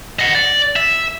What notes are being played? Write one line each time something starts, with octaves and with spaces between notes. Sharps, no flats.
D#5 F#5
D5
E5